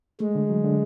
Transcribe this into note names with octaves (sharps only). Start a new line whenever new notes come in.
G#3 A3
D3
F#3
D3